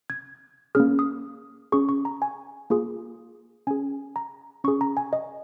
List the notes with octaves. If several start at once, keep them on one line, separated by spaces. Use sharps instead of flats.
G#6
A#3 C#4 G#4 F6
D#6
C#4 G#4 C#6
C#6
A#5
G#5
A#3 F4 G#4
C#4 G#4 G#5
A#5
C#4 G#4 C#6
A#5
G#5
D#5